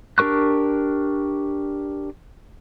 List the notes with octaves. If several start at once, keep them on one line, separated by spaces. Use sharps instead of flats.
D4 G4 A#4 C#6 F#6